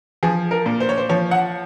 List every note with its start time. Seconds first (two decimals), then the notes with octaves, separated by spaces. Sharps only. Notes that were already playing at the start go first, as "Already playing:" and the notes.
0.23 F3 G#4
0.51 A#4
0.66 A#2
0.80 C5
0.89 C#5
0.98 C5
1.09 F3 C#5
1.31 F#5